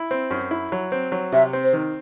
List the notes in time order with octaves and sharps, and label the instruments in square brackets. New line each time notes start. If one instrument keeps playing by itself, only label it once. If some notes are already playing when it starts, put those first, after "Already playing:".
Already playing: [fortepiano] E4
C4
F#2
E4
F#3
C4
F#3
[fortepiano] C3 [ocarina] E5
[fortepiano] C4
[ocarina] C5
[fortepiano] D#3